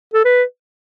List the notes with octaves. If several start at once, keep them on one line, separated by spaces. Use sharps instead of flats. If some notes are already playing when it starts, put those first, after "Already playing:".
A4
B4